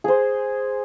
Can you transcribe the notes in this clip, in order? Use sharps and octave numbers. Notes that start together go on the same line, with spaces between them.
G#4 C5